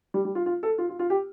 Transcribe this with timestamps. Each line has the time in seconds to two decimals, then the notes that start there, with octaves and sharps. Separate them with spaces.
0.14 G3
0.25 G3
0.35 F4
0.46 F4
0.63 A4
0.78 F4
0.89 F4
0.99 F4
1.10 G4